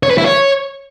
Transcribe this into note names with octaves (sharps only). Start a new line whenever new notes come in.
C#5
B4
E4
C#5